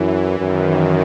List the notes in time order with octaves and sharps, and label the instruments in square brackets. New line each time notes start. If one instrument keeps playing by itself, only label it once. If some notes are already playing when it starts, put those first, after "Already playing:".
Already playing: [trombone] F#2 [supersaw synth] E3
[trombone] F#2 [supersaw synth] D#3